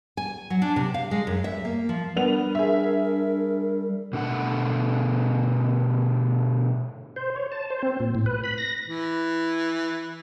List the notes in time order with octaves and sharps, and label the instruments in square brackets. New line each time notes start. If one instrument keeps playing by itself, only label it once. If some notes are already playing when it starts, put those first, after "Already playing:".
[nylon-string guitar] G#5
F#3
D4
C3
F5
G#3
F#2
E5
A#3
F3
[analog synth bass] G3 [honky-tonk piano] B3 F7 [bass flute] D4 [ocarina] A#4
[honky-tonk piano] G#4 E5
[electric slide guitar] B2 D3 A3 F#5
[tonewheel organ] C5
C#5
A5
C5
C4
A#2
A2
B4
B5
A#6
[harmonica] E3